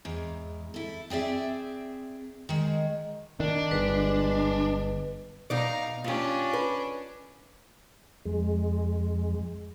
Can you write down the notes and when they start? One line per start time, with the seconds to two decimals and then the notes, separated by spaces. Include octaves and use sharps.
0.05 E2 G#2
0.74 E4 A4
1.10 C4 G#4 D5 E5
2.49 D#3 G#3
3.40 D#3 D4
3.71 G1 G#3 B4
5.50 B2 D#4 D5 F5 A#5
6.04 C#4 D4 F4 G4
6.53 B4
8.25 F2 G#3